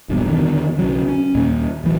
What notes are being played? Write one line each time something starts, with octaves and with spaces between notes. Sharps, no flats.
E1 A#1 G2 B2
E2 D3 D#3
B1 C#3 F#3
C#4
D#2 A#2
D#1 A1 E3 F#3